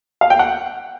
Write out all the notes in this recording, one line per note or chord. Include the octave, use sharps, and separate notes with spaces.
F5
G5
F#5